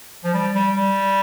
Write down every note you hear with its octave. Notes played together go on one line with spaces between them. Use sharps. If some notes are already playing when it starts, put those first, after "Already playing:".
F3
G3
G3
G3